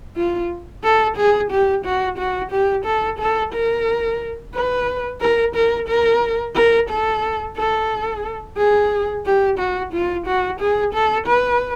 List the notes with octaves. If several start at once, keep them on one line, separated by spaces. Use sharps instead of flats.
F4
A4
G#4
G4
F#4
F#4
G4
A4
A4
A#4
B4
A#4
A#4
A#4
A#4
A4
A4
G#4
G4
F#4
F4
F#4
G#4
A4
B4